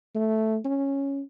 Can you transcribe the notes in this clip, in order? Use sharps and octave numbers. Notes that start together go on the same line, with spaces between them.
A3
C#4